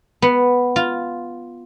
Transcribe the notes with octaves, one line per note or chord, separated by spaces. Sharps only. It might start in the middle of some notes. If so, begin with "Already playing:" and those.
B3
F4